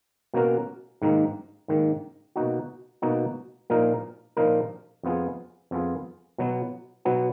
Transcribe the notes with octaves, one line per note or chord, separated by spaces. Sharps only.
B2 A#3 C#4 F#4 A#4
G#2 D#3 A#3
G#2 D#3 A#3
B2 A#3 D#4 F#4
B2 A#3 D#4 F#4
A#2 F3 A#3 D#4 A#4
A#2 F3 A#3 D#4 A#4
F2 F3 B3 F4 G#4
F2 F3 B3 F4 G#4
B2 F#3 B3
B2 F#3 B3